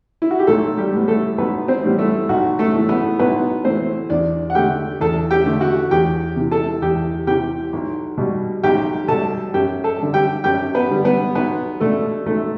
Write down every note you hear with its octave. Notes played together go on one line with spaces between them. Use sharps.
E4
F#4
G4
B1 A3 A4
G3 G4
A2 E3 G3 B3
A3 A4
B1 B3 B4
C4 C5
A2 E3 G3 B3
A3 A4
B1 F#4
A3 A4
A2 E3 A3
B3 B4
B1 B3 B4
A2 E3 A3 C4 C5
E2 D4 D5
F#5
D3 A3 G4 G5
E2 A4 A5
G4 G5
D3 A3
F#4 F#5
E2 G4 G5
C3 E3
A4 A5
E2 G4 G5
C3 E3 G4 G5
B1
B2 G3
B1 G4 G5
B2 G3 A4 A5
F#2 G4 G5
A4 A5
D3 G3
G4 G5
F#2 G4 G5
B3 B4
D3 G3
B3 B4
B1 B3 B4
B2 A3 D4 A4
B1 A3 A4